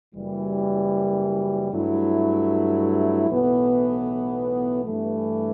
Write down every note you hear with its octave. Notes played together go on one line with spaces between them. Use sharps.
F#1 F#2 E3 G3
G2 F#3 A3 E4
B1 A2 E3 B3
G2 E3 A3